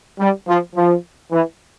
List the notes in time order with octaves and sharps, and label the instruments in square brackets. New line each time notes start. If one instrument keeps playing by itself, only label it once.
[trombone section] G3
F3
F3
E3